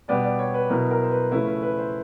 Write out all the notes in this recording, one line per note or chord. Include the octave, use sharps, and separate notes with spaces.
B2 G3 B3 D4 D5
D5
C#5
B4
B2 F#3 B3 E4 A#4
A#4
C5
B4
C#3 F3 A3 C#4 E4 B4
B4
B4
C5